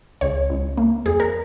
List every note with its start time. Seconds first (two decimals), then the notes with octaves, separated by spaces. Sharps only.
0.21 C#2 C#5
0.50 C#2
0.77 A#3
1.06 F2 G#4
1.20 A#4